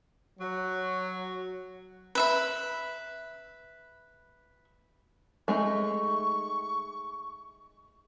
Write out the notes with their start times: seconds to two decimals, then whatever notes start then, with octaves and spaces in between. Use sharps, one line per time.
0.40 F#3
2.15 B4 E5 B5
5.48 G#3 A3 D#4 C#6